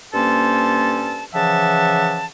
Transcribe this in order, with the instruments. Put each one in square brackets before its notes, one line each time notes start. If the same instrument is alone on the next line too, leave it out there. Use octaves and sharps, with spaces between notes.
[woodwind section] G2 A#3 C#4 A4 C5 A5
C#3 E3 F3 E5 F#5 A5